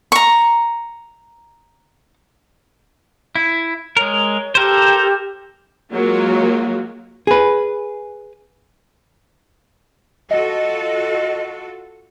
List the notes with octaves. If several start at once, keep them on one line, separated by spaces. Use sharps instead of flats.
A#5 C#6
E4
G#3 A#4 C#5
G4 A4 A#4 C5
F#3 G#3 A#3 F4 F#4
G#4 B4
F4 F#4 A4 D#5